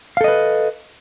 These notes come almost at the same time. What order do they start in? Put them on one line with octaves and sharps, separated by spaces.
F5 A4 D#5 B4